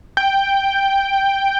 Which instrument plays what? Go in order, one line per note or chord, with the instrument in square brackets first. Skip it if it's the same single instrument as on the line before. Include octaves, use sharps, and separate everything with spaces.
[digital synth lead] G5